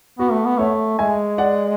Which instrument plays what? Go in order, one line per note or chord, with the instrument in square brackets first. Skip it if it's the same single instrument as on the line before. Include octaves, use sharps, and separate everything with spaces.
[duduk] B3 [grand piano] F#4
[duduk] A3
B3
[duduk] A3 [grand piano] C#5 E5
[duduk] G#3 [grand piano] E5 G#5
[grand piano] D5 F#5